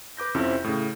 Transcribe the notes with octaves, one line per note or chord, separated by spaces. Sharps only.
B4 D6 G6 A#6
F2 C3 C4 C#4 E4
A2 C#3